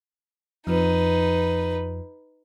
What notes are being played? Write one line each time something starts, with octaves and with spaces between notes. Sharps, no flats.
F2 F3 D#4 B4